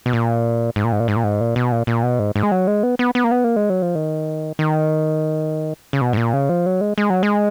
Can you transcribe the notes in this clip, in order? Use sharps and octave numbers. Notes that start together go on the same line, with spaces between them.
B2
A#2
G#2
A#2
G#2
A#2
G#2
A#2
G#2
A#2
B2
A#2
A#2
B2
G#2
G#2
G#3
F#3
G#3
B3
B3
B3
A#3
B3
A#3
G#3
F#3
F3
D#3
D#3
C#3
B2
G#2
A#2
C#3
F3
F#3
G#3
G#3
F#3
G#3